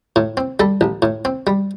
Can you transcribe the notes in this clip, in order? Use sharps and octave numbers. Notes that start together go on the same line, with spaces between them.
A2
C4
G3 A4
A1
A2
C4
G3